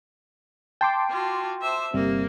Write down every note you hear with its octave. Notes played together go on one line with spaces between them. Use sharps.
G5 A5 C6 D6
F4 F#4
C5 E5
G1 C3 G3 A#3